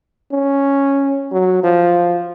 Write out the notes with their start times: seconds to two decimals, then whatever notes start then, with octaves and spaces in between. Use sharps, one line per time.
0.32 C#4
1.31 F#3
1.63 F3